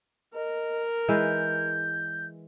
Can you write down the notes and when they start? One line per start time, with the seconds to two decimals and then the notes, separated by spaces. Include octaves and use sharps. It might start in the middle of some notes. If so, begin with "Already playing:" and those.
0.34 A#4 D#5
1.08 E3 G#3 B4 G6